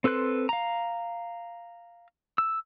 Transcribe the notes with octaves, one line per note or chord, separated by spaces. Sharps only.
C4 A4 B4 C6 F#6
F5 A#5
E6